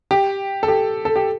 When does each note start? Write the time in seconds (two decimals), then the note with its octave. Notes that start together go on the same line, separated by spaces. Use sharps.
0.11 G4
0.63 A4
0.68 G4
1.05 A4
1.16 G4